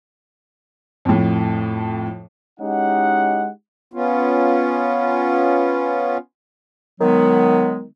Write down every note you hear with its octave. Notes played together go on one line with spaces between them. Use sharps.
F2 A2
G#3 C#4 D#4 E4 G4 F#5
B3 C#4 F4
D#3 F#3 G#3 B3